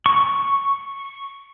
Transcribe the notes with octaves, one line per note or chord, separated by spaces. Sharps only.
C#6